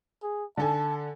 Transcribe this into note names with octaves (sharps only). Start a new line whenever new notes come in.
G#4
D3 A4 G#5 A5